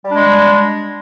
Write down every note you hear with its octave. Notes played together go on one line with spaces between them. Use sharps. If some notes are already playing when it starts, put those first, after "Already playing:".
G3 G#3 D4